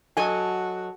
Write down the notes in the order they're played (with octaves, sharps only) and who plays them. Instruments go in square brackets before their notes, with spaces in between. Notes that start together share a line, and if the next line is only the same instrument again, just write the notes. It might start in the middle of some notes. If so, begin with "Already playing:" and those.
[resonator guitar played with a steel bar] F#3 A4 D#5 [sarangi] F#4 [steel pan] G#5